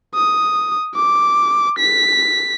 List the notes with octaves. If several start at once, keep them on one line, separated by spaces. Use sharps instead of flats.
D#6
D6
B6